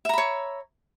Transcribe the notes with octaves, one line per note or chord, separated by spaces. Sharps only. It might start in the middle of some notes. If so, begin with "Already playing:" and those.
C#5 E5 A#5 B5